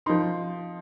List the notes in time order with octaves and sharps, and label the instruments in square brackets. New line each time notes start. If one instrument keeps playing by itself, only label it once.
[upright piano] F3 D#4 C6